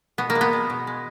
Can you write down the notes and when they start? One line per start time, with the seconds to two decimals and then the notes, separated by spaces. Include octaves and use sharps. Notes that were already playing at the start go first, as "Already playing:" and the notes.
0.18 B2 B3
0.30 A#3
0.35 G#3
0.41 B3
0.53 G#3
0.70 B2
0.87 G#3